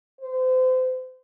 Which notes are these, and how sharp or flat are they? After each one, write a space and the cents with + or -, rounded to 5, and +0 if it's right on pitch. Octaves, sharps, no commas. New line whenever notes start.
C5 -30